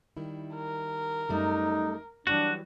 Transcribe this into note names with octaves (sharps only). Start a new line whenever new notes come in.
D#3 G3 E4
A#4
F#2 G3 A3 D#4
E3 F#3 G3 D4 F#4